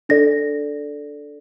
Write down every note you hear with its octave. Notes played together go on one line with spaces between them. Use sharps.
D4 A4 D5 A#6